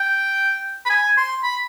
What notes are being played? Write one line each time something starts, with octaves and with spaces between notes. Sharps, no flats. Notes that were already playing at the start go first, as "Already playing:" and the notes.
Already playing: G5
B5
G#5
C6
B5